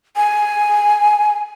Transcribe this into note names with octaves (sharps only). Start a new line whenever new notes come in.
G#5